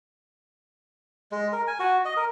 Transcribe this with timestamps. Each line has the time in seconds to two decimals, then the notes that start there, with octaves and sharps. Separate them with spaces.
1.32 G#3
1.53 A#4
1.67 G#5
1.79 F#4
2.05 D#5
2.17 A#4